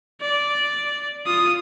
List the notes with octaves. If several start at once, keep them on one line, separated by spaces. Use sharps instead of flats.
D5
F4 D#6